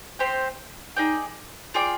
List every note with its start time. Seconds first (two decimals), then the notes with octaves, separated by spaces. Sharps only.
0.19 C4 G4 C5 G5
0.96 D#4 G#4 D5 G5
1.74 F4 G#4 D5 G5